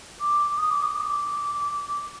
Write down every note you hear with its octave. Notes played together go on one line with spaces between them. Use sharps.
D6
D#6
D6
D#6
D6